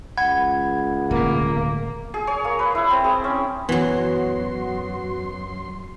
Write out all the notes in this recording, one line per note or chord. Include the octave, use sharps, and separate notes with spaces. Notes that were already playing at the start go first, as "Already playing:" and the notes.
C#2 F#5 B5 G#6
D1 B2 A#3
G#4
C#5
A#3
B4
E4
C4
G#4
C#4
F#2 E3 F#3 B3 F#4 C6